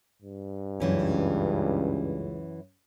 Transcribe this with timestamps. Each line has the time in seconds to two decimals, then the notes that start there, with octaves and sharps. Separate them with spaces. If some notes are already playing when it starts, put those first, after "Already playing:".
0.22 G2
0.80 C#2 F#2 E3 C#4